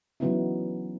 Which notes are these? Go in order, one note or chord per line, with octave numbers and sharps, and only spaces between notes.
E3 F#3 B3 C#4 D#4 E4